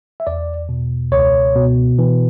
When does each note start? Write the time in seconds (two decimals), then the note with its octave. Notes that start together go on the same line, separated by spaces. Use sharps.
0.20 E5
0.27 E2 D5
0.69 B2
1.12 C#2 C#5
1.56 B2
1.99 E3